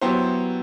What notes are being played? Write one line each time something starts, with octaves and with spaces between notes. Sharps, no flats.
F#3 B3 E4 G4 C5